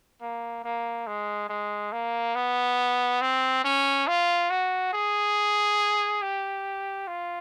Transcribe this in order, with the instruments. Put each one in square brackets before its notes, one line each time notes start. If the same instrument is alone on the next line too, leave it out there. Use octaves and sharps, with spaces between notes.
[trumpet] A#3
A#3
G#3
G#3
A#3
B3
C4
C#4
F4
F#4
G#4
G4
F4